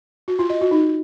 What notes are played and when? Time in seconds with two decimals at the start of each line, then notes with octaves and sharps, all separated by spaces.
0.28 F#4
0.39 F4
0.50 D#5
0.61 F#4
0.71 D#4